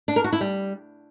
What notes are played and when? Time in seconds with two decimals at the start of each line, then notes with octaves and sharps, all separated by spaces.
0.08 D4
0.16 A#4
0.24 F#4
0.33 E4
0.41 G3